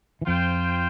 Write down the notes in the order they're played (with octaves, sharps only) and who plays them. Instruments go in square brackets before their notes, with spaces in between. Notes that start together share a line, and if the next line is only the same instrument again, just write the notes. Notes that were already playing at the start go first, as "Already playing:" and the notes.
[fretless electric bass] E3
[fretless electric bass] F2 F3 [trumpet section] F4 C5 G5